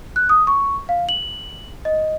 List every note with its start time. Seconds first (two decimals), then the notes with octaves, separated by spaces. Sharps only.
0.16 F#6
0.29 D#6
0.47 C#6
0.89 F5
1.09 F#7
1.85 D#5